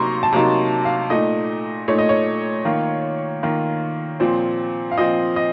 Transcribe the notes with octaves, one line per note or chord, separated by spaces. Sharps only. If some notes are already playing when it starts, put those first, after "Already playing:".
Already playing: C3 F#3 A#3 D#4 A#5 C6 C#6
A5
C3 F#3 A#3 D#4 A#5
F5
A#2 A3 D#4 D#5
A#2 A3 D#4 C#5
D#5
C#5
D#3 A#3 F4
D#3 A#3 F4
A#2 F3 C4
F5
A#2 F3 C4 D#5
D#5